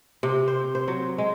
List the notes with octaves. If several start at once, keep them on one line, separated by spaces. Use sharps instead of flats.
C3
C5
C5
F#3
G#3